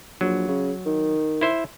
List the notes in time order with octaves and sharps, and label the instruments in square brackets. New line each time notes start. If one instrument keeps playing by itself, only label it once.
[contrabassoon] A#1 [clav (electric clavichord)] F#3
[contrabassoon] C#3
D#3
[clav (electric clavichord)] E4 C5 E5